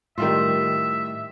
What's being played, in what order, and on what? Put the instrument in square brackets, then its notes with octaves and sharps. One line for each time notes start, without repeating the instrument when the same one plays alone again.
[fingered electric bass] A2 [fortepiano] D#3 G3 F4 [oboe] E5